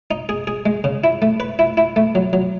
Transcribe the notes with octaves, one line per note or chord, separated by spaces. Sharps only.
D#4
G#4
G#4
G#3
C#3
E4
A3
B4
E4
E4
A3
F#3
F#3